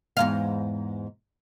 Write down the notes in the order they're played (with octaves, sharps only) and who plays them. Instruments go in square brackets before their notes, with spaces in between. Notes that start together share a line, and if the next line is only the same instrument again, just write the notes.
[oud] E2 G#2 F5